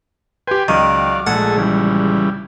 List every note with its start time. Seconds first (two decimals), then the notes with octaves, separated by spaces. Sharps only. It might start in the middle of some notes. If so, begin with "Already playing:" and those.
0.47 G4 B4 G5 G#5 C6
0.68 C#2 D#3 F#3 D5 F5
1.27 A#1 G#3 A3 G#4 A4 F#5
1.57 C#3 E3 G3